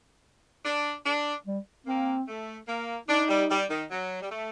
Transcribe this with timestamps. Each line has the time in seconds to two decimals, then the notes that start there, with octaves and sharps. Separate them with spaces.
0.64 D4
1.06 D4
1.46 G3
1.86 A#3 C4
2.28 A3
2.68 A#3
3.08 D4 D#4
3.29 G3
3.50 G3
3.69 D#3
3.90 F#3
4.22 G3
4.31 A3